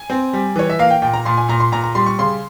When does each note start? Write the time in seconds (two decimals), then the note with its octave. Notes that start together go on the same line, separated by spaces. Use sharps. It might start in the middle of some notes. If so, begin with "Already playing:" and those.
Already playing: G#5
0.10 C4
0.33 G3
0.56 E3 C#5
0.70 E5
0.79 A#3 F5
0.90 G5
1.02 A#2 G5
1.14 A#5
1.25 A#2 C6
1.37 G#5
1.48 A#2 A#5
1.60 C6
1.72 A#2 A#5
1.84 A#5
1.95 G3 C6
2.06 C#6
2.19 C#3 C6